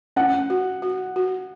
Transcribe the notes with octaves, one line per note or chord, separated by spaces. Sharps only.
C#4 F#5
F#4
F#4
F#4